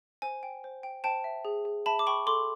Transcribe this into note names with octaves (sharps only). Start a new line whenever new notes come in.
C5 G#5
G5
C5
G5
C5 G5 A5
E5
G#4
G#4
E5 A5 B5
D6
G5 B5 C#6
A4 C6 D6